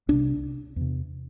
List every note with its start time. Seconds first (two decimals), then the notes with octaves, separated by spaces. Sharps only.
0.08 C2 C3 D4
0.76 E2 C3